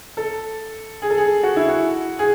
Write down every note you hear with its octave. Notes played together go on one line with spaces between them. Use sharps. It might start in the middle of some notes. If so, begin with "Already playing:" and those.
A4
G#4
A4
G#4
F#4
E4
F#4
G#4